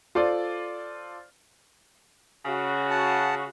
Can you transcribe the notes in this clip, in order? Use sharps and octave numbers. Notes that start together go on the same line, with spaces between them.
F4 A4 C5 D5
C#3 F#4
F#5 A5